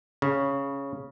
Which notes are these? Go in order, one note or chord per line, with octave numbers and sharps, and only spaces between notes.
C#3